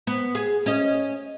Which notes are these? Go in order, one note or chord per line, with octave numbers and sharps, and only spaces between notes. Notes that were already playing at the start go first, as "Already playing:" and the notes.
B3
G#4
C#4 D#5